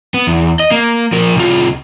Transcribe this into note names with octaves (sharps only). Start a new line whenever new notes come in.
B3
E2
D#5
A#3
F3 A#4
C2 F4